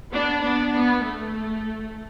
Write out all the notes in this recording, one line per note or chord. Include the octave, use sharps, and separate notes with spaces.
B3 D4
B3 D4
B3
A3